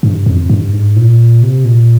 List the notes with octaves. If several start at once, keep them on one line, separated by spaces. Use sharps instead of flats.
G2
F2
G2
G#2
A#2
C3
A#2